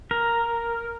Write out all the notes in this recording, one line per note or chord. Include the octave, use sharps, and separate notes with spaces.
A#4